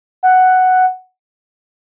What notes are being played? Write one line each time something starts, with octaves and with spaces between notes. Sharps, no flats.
F#5